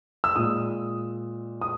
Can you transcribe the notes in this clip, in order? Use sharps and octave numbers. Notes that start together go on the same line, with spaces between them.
E6
A#2 G#3 D#6
D#6